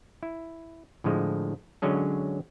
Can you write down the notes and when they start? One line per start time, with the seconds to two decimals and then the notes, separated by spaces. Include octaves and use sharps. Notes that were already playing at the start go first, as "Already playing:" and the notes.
0.23 E4
1.04 A2 D3 F3 G#3
1.82 D3 F#3 G#3 C#4 G#4